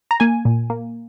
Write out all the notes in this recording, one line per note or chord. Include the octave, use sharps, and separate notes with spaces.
A#5
A#3 G#5
A#2
A#3